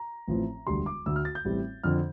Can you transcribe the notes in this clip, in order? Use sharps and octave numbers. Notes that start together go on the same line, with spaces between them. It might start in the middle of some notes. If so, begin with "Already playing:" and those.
Already playing: A#5
A1 A2 F3 C4
E1 D2 D3 G3 C6
D6
D2 D3 A3 E6
F6
A6
G6
A1 A2 G3 C4
F2 D3 F3 F6